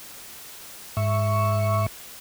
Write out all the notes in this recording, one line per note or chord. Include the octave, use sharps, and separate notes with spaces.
G#2 E5 C#6